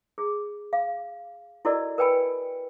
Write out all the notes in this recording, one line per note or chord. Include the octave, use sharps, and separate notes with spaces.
G#4
F5
E4 F#4 A4 A#4 D5 D#5
A#4 B4 G5 G#5 B5